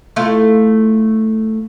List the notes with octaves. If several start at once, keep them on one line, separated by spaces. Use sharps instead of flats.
A3 E4 F4